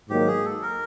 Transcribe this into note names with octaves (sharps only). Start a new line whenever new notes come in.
G#2 D#3 F#3 A#3 G4
G#4
A4
A#4